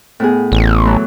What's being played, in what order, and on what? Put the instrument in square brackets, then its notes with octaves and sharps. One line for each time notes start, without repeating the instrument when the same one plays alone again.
[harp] A2 B3 G#4
[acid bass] A1
[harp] E3 F#3 A3